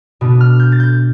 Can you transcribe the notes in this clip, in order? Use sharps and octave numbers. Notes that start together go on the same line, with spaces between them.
B2 B3 D4
F6
G6
A6
G6